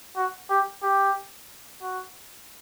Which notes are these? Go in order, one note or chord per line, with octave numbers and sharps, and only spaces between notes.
F#4
G4
G4
F#4